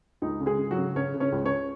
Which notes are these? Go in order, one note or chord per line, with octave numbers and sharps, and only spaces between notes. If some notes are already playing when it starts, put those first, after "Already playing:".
C#2 D#4
C#3
G#3 G#4
C#3
F#3 F#4
C#3
C#3 C#4 C#5
C#3
C#4 C#5
C#2
C#4 C#5